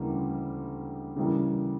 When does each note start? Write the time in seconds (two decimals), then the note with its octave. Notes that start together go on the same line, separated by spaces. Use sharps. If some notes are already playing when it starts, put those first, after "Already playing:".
Already playing: D2 C#3 E3 G3 A#3
1.16 C#3 E3 G3 A#3